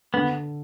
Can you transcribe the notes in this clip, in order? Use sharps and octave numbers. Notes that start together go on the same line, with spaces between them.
D3 B3